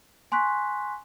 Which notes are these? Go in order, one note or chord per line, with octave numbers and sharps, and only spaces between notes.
G#5 C6 C#6 F#6 B6